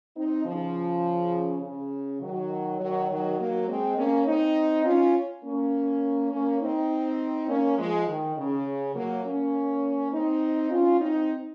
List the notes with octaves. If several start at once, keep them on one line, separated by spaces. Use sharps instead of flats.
C4 D#4
C#3 F3
C#3
D#3 F#3
D#3 F#3
D#3 F#3
F#3 A#3
G#3 C4
A#3 C#4
C4 D#4
C#4 F4
A#3 C#4
A#3 C#4
C4 D#4
A#3 C#4
F3 G#3
D#3
C#3
F#3 A#3
A#3 C#4
C4 D#4
C#4 F4
C4 D#4